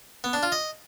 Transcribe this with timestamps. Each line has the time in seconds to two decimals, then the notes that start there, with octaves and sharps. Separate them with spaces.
0.24 B3
0.33 D4
0.43 F4
0.52 D#5